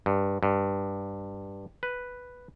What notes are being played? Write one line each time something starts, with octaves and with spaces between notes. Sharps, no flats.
G2
G2
B4